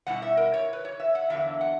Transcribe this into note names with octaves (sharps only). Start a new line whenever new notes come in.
B2 G3 C#4 E4 F#5
E5
A#4
C#5
B4
C#5
E5
F#5
E2 D3 F#3 A#3 E5
F#5